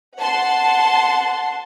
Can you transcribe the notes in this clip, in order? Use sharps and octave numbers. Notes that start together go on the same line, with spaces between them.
F#5 A5 C6